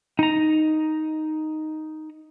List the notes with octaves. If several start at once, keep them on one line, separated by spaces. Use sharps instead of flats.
D#4 A#5